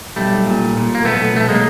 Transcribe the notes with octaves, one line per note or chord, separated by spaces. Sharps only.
B1 G3 A3
A#2
A#2
A#3
B1 A3 B3
B1 A3
G#3 A#3